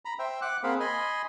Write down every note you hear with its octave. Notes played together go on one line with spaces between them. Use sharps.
A#5 B5
C5 E5 G5
F#5 D6 F#6
A#3 C4 G#4 C5 F5 B5
D#5 G#5 B5 C6